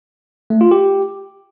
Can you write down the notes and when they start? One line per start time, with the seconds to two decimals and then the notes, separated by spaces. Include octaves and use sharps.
0.50 A3
0.61 F4
0.71 G4